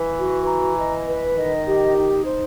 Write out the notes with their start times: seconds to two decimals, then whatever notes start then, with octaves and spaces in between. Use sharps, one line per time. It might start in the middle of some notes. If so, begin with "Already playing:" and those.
Already playing: E3 B4
0.18 F#4
0.48 A#5
0.77 D#5
1.07 B4
1.36 D#3 D#5
1.67 G4
1.95 D#4
2.25 C5